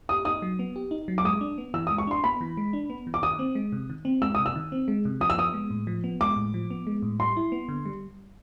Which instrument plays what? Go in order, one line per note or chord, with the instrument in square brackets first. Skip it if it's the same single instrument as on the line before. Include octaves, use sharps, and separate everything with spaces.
[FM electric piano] G4 [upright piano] D#6
[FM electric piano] D#4 [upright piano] D#6
[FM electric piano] F#3
B3
G4
D#4
F#3
[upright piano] D6
[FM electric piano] G#3 [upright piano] D#6
[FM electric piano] D4
B3
[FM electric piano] E3 [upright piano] E6
[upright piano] D#6
[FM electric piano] G#3
[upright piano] C#6
[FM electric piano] D4 [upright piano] C6
[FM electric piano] B3 [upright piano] B5
[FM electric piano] E3
G#3
D4
B3
E3
[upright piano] D6
[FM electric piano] D#3 [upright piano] D#6
[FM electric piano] C4
G#3
C3
D#3
C4
[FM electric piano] G#3 [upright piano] E6
[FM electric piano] C3 [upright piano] D#6
[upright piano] E6
[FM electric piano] D#3
C4
G#3
C3
[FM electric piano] F3 [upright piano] D#6
[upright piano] E6
[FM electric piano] B3 [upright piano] D#6
[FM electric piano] G#3
A2
F3
B3
[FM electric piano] G#3 [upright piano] D6
[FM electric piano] A2
F3
B3
G#3
A2
[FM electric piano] G3 [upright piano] C6
[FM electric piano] E4
B3
D3
G3